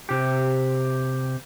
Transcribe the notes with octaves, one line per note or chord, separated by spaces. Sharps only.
C3 G4